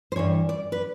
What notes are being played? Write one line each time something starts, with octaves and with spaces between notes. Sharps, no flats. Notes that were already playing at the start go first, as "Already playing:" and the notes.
C5
G2 E3 C#5
D5
B4